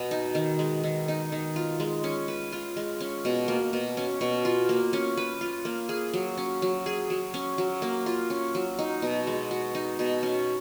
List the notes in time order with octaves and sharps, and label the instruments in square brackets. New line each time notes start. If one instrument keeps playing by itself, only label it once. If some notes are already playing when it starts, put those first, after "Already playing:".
Already playing: [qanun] B2 B3
D#4
D#3
G#3
D#3
D#4
D#3
F4
G#3
C#4
B4
F4
G#3
C#4
B2
A#3
B2
C#4
B2
F4
A#3
C#4
B4
F4
A#3
G#4
F#3
C#4
F#3
G#4
F#3
C#4
F#3
A#3
F4
C#4
F#3
D#4
B2
G#3
F#4
D#4
B2
C#4